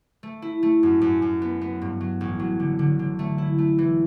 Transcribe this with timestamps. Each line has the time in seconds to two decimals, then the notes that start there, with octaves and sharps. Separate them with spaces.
0.23 A3
0.42 E4
0.63 A3
0.83 F#2
1.01 F#2
1.22 F#2
1.42 B3
1.61 B3
1.82 G2
2.01 F#3
2.21 A1
2.40 F#3
2.60 D3
2.79 D3
2.99 D3
3.19 A3
3.38 E4
3.58 A3
3.78 E3